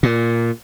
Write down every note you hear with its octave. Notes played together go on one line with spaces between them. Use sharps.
A#2